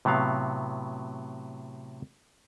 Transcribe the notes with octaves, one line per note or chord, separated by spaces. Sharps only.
A2 C3 F#3 B3 F5